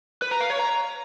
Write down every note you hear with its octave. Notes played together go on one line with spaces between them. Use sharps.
B4
A#5
F5
C#5
A#5